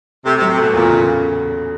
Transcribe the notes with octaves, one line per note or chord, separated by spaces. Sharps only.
C3 A3
C3
F#3
C3
B2 A3
E2 A#2
C#3